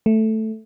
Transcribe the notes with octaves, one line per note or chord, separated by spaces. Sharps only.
A3